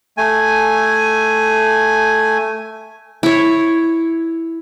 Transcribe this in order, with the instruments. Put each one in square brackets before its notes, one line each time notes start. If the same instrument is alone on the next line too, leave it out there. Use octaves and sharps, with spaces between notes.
[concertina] A3 G#5
[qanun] E4 C#5